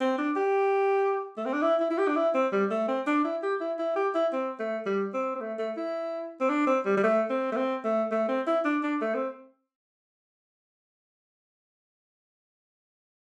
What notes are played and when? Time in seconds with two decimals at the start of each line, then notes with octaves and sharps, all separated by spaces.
0.01 C4
0.18 D4
0.36 G4
1.37 A3
1.46 C4
1.53 D4
1.62 E4
1.80 E4
1.90 E4
1.98 G4
2.08 D4
2.16 E4
2.34 C4
2.52 G3
2.70 A3
2.88 C4
3.07 D4
3.24 E4
3.42 G4
3.60 E4
3.78 E4
3.96 G4
4.15 E4
4.32 C4
4.59 A3
4.86 G3
5.14 C4
5.35 C4
5.41 A3
5.59 A3
5.77 E4
6.40 C4
6.49 D4
6.67 C4
6.85 G3
6.97 G3
7.03 A3
7.30 C4
7.52 A3
7.56 C4
7.84 A3
8.11 A3
8.28 C4
8.47 E4
8.65 D4
8.83 D4
9.01 A3
9.15 C4